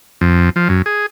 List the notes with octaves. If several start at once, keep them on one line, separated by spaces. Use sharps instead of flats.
F2
F3
F#2
G#4